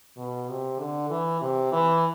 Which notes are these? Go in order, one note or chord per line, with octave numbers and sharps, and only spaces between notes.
B2
C3
D3
E3
C3
E3